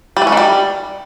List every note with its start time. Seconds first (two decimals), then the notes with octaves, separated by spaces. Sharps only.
0.17 G3
0.22 E3
0.27 C#4
0.32 D#3
0.37 G3